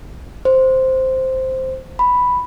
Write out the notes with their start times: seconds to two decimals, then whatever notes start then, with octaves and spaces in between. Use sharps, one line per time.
0.45 C5
1.99 B5